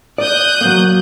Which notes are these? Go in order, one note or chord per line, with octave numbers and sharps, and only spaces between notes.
D5 D#6 F#6 G6
F#3 A#3